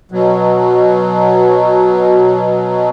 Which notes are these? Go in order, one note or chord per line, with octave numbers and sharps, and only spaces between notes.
B2 F#3